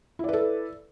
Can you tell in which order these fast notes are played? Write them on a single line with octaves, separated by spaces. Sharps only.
E4 D5 B4 A4